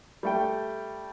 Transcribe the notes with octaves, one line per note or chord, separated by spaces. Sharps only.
G3 A3 G5